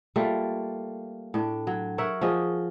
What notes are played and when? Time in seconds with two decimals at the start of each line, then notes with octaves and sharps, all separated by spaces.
0.16 G3 A3 A#3 F4
1.34 A2 D4
1.67 F#3
1.98 A#4 C#5 E5 F#5
2.21 F3 F#4 G#4 D#5